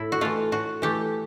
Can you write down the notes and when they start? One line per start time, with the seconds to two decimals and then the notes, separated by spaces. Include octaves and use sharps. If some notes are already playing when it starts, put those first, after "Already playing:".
Already playing: A2 E4
0.12 F#4
0.21 E3 A3 F4
0.52 A2 F#4
0.82 E3 A3 G4